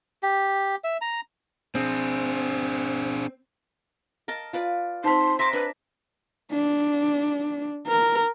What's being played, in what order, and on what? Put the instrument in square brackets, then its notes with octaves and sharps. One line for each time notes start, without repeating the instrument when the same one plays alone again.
[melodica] G4
E5
A#5
[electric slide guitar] C4 [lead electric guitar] D4 G#4
[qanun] A#4 D#5 A5
F4 B4 D5
[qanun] C4 C5 [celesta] D#4 A5 B6 [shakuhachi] C6
[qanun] E5 D6 [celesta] A#5 A#6 B6 [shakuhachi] C6
[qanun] D4 [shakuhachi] B4
[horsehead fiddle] D4
A#4